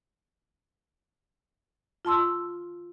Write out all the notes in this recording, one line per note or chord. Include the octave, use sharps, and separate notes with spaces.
F4 A5 C6 E6